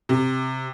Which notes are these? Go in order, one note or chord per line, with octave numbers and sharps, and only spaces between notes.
C3